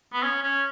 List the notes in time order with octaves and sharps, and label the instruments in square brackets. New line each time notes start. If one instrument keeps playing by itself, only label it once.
[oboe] B3
C#4
C#4